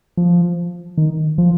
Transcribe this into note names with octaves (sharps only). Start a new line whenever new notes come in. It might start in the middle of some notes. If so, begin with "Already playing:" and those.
F3
D#3
F3